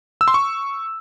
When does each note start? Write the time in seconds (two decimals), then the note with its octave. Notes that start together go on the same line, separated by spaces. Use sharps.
0.21 E6
0.28 C6
0.34 C#6